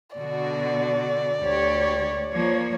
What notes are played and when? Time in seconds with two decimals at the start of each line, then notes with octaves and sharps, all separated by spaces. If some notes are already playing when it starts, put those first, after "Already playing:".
0.17 B2 D3 F#4 D5
1.41 D2 G4 C#5
2.31 F3 A#3 C#5